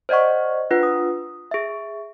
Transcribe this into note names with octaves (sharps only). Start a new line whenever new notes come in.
C5 D5 D#5 F#5 C#6
D4 F4 B4 F#5
D#6
G#4 E5